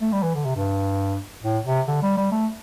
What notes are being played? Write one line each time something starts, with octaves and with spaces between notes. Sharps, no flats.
A3
G3
E3
D3
C3
G2
A2
C3
D3
G3
G3
A3